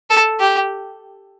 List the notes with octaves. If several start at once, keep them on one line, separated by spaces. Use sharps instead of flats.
A4
G4